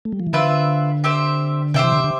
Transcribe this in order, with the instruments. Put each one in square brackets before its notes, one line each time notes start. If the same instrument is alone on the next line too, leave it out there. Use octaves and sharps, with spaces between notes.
[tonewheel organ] A3
G3
F3
E3
[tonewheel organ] D3 [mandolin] C4 F4 B4 E5
[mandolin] C4 G4 C5 E5
[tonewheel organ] C3 [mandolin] G4 C5 E5 G5
[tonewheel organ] E3
D3
D3